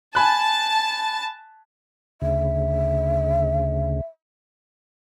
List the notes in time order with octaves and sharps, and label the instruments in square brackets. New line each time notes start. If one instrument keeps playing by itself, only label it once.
[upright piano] G#5 B5 F#6 [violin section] A5
[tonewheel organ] D2 C#3 [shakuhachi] E5